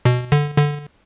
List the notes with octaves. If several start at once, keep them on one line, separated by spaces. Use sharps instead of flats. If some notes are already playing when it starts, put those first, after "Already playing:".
B2
D3
D3